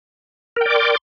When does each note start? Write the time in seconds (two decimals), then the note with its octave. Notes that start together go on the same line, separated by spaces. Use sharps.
0.56 A#4
0.61 G5
0.66 D5
0.70 D6
0.75 C6